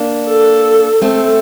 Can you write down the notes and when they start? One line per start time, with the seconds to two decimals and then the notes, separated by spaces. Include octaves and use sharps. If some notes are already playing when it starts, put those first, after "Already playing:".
Already playing: A#3 D4
0.29 A4
1.02 A3 C4 A4